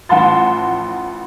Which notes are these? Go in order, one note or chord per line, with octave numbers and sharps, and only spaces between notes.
A1 F3 F#5 A5 C6 A6